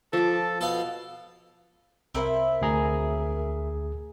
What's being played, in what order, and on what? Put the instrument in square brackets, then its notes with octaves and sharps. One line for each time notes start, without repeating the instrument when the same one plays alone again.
[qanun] F3 D6 [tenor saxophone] A4
[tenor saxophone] B2 [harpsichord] A4 F5
[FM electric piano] C2 A#4 E5 [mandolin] C4 E4
[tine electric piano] D2 G#4 A#5